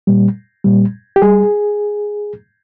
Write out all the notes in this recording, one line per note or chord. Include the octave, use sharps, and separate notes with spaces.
A#2 G3
A#2 G3
G4
G3 G#4